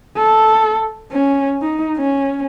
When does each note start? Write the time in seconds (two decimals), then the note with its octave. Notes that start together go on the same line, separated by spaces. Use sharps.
0.17 A4
1.12 C#4
1.62 D#4
1.97 C#4